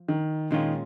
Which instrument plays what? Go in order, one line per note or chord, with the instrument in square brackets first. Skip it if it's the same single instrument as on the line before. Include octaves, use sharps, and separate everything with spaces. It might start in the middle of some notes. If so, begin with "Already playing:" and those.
Already playing: [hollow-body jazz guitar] F3
[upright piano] D#3
[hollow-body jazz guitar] A#2 G#3 C#4 F4 [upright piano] D#3